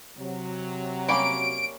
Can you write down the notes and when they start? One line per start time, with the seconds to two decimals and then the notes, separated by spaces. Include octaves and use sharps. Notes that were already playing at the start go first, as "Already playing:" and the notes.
0.18 C3 F#3
1.08 G3 A#3 C#4 D7